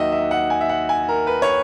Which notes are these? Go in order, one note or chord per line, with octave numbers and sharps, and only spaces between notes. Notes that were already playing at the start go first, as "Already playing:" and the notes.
Already playing: D#2 D#3 F#3 D#5 E5 F#5
E5
F#5
G#5
E5
F#5
G#5
A#4
B4
C#5